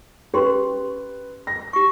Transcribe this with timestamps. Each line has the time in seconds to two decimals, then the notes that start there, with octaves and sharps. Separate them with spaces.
0.34 C#4 G4 B4 C6
1.47 A#6
1.73 G4 C#6